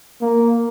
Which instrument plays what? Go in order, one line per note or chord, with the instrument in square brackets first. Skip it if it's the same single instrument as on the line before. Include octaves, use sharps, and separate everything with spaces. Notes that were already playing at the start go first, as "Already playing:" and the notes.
[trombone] A#3